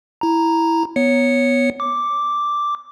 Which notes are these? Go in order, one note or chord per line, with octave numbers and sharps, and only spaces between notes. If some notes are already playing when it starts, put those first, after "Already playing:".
E4 A#5
B3 C#5 C#7
D6